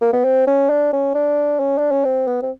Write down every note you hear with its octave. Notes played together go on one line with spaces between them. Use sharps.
A#3
B3
C4
C#4
D4
C#4
D4
C#4
D4
C#4
C4
B3
C4